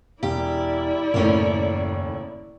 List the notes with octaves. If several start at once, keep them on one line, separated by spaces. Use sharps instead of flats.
E1 E4 G4 D5
D#1 F#2 A2 C#3 C#4 A#4